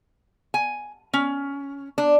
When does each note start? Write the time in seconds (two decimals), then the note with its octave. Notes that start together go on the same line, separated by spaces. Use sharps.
0.54 G#5
1.13 C#4
1.98 D4